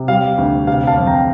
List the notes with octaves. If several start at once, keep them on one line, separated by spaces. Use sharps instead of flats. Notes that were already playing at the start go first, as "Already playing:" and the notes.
Already playing: C3
G3 F5
D2
C3 F5
F5 A5
F2
G5 A#5